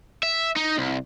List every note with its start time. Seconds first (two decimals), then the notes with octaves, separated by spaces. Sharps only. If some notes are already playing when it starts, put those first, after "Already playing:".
0.23 E5
0.57 D#4
0.78 C2